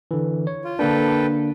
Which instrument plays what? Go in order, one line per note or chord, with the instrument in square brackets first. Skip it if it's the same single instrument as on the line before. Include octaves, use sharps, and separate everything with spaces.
[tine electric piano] D3 E3
C#5
[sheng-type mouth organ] F4
[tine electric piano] D3 A#3 D4 [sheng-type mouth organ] A4 B4 G5